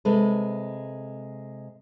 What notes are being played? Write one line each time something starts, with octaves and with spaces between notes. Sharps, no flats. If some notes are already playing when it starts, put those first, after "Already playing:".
C3 G#3 A4 B4